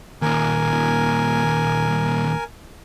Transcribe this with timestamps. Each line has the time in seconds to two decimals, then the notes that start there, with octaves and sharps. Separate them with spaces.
0.22 D#2 A#2 A#4 G#5